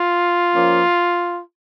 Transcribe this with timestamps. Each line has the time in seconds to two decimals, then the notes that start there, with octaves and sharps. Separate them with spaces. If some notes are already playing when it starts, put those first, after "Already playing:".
Already playing: F4
0.53 F3 A#3 C#4